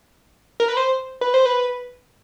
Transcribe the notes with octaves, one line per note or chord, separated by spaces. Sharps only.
A#4
B4
C5
B4
C5
B4